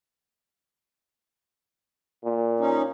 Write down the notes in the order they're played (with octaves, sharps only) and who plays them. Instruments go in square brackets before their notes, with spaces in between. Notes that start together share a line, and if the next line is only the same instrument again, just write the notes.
[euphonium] A#2
[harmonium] C#4 D#4